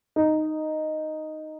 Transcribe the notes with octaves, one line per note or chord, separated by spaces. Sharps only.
D#4